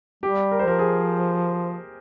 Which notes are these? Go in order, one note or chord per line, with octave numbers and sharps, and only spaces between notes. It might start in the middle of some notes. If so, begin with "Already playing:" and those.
G3 G4
A#4
C5
F3 A#4
G#4